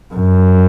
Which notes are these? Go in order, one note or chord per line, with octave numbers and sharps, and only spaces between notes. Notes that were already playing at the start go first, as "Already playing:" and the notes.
F#2